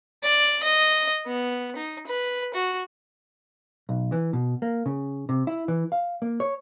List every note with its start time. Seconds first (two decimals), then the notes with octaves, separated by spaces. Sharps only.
0.23 D5
0.63 D#5
1.26 B3
1.76 D#4
2.07 B4
2.54 F#4
3.89 B1
4.12 E3
4.33 B2
4.62 A#3
4.86 C#3
5.29 C3
5.47 E4
5.68 E3
5.92 F5
6.22 A#3
6.40 C#5